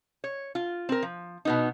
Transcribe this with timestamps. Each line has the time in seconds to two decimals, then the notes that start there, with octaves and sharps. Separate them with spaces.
0.24 C#5
0.55 F4
0.89 C4 A#4
1.02 F3
1.45 B2 B3 D#4